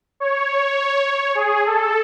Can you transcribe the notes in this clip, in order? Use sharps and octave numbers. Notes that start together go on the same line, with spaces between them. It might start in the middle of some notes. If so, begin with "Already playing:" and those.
C#5
G#4
A4